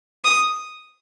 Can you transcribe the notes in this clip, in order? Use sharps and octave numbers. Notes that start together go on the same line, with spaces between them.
D#6